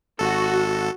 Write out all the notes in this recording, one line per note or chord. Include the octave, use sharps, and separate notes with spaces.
G#1 F#4 A4